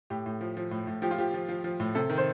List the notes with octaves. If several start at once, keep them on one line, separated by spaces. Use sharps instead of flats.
A2 G4
A2
F3
F3
A2
A2
F3 G4
F4
F3 G4
F3
F3
F3
A2
C3 A4
D#3
C5